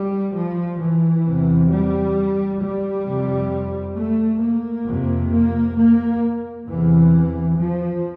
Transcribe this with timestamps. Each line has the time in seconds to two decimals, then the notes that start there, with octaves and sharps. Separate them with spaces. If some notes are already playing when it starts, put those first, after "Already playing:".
Already playing: G3
0.35 F3
0.81 E3
1.25 E2 C3
1.70 G3
2.61 G3
3.06 F2 C3
3.96 A3
4.42 A#3
4.86 F2 C3
5.32 A#3
5.77 A#3
6.66 E2 C3 E3
7.58 F3